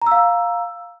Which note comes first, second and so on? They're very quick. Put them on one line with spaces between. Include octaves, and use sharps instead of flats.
A#5 E6 F5